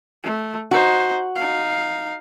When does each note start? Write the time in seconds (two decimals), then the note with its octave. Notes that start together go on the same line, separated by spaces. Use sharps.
0.24 A3
0.71 D#4 F#4 C5
1.36 D#4 F5